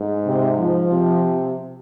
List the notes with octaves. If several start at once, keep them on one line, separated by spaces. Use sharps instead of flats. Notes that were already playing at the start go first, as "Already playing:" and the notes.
Already playing: G#2
C3
F3
C3